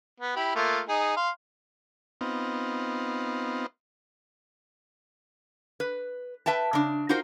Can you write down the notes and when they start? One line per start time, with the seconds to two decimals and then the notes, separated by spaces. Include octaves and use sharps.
0.20 B3
0.36 E4 G4 B5
0.55 A3 A#3 F4
0.89 D#4 G#4
1.17 F5 C6
2.21 B3 C4 D#4 F4
5.80 B4
6.46 B4 E5 G5 A5
6.73 C#3 D4
7.09 D#4 F4 F#4 A#4 C5